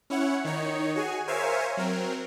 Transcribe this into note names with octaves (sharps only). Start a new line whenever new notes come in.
C#4 E4 C#5 F#5
D#3 D#4 C#5
F#4 G#4 G#5
A#4 C5 C#5 E5 F5 G#5
F#3 C4 A#4